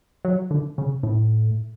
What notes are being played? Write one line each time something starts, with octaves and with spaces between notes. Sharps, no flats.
F#3
D3
C#3
A2